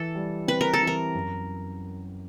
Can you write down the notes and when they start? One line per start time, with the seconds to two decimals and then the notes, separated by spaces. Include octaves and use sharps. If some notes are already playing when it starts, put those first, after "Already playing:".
Already playing: E3 A4
0.15 G3
0.47 C4 B4
0.61 A#4
0.74 A4
0.81 E3
0.87 A#4
1.14 F#2